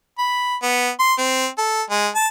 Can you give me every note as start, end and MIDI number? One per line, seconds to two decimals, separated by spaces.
0.18 0.55 83
0.62 0.89 59
1.00 1.13 84
1.19 1.46 60
1.58 1.82 69
1.90 2.08 56
2.15 2.27 81